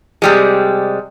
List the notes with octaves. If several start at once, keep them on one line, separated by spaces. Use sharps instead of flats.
C3 G3 G#3